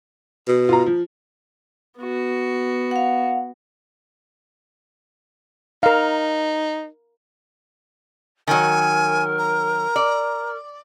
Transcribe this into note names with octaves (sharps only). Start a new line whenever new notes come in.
B2
F4 A#5
F3
B3 F#4
F5 F#5
D#4 A#4 F5
D#3 F#3 A#4 G#5
A#5
D5